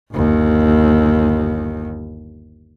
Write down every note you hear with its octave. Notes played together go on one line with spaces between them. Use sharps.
G1 D#2